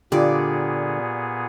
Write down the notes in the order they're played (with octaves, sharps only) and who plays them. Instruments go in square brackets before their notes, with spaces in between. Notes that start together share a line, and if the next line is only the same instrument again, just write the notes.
[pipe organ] A#2 B3 G#4 [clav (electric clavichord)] D3 [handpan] F4 G4 [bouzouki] D5